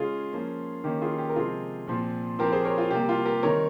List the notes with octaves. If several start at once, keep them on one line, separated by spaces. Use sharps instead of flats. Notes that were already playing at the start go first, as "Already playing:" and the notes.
Already playing: C#3 G#3 C#4 F4 G#4
F3 A#3 C#4
D#3 A#3 C#4 G4
F4 G#4
G4
A#4
C3 F3 G#3 C4 F4 G#4
A#2 F3 C4
F3 C4 G4 A#4
G#4 C5
A#4 C#5
F4
C3 G3 A#3 G4
F4
G4 A#4
D#3 G3 C4 A#4 C#5